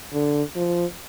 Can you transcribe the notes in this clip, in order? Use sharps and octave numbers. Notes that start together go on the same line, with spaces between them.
D3
F3